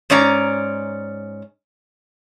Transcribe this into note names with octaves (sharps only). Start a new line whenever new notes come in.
G#2 C#4 D5 A#5